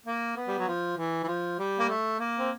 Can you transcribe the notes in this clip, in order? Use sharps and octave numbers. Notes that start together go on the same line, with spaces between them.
A#3
B3
G3
F#3
F3
E3
E3
F3
G3
A#3
A3
A#3
C4